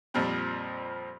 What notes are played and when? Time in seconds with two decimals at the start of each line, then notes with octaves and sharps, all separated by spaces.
0.14 F2 A#2 F3 G3 C4